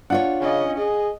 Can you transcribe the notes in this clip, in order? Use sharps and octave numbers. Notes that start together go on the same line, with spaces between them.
D4 F4 C#5 F#5
C#3 C#4 D#5
G#4 D#5